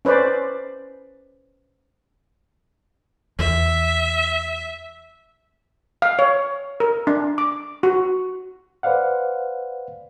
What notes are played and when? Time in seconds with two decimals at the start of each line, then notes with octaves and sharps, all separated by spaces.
0.05 C#4 B4 C5 D5
3.39 E2 E5
6.02 F5
6.19 C#5
6.80 A#4
7.07 D4
7.38 D6
7.83 F#4
8.83 B4 C5 D5 F5 F#5